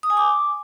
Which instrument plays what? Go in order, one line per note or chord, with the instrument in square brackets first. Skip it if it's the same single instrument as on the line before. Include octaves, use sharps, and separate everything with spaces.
[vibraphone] D#6
G#5
D6